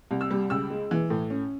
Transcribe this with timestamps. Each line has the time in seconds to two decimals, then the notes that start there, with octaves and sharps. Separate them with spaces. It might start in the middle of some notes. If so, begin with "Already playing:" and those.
0.11 C2
0.21 E6
0.31 G3
0.50 C#2 E6
0.70 G#3
0.91 E3
1.10 A2
1.30 C#4